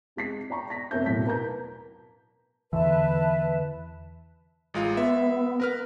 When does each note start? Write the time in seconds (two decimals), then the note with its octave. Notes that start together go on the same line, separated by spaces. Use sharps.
0.16 C3 G#3 B6 C7
0.50 D5 G5 A#5 C#6
0.70 A#6 B6
0.91 F1 F2 A#4 C#5 E5 G6
1.06 E1 A2 F#3 B6
1.26 A#4 B4 A5 A#5 G6
2.73 E2 D3 E3 B4 E5 A5
4.74 A1 G#3 F4
4.97 B3 E5
5.60 A#4 B4 F6